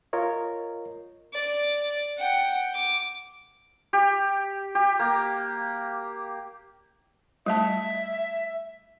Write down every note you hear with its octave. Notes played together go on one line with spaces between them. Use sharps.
F4 A#4 C#5 D#5
D5
F#5 G5
D6
G4
G4
A#3
G3 A3 E5 A5